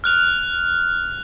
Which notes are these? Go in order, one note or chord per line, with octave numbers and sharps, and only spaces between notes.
F6 F#6 F7